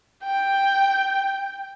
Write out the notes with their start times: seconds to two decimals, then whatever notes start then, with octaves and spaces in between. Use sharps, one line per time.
0.24 G5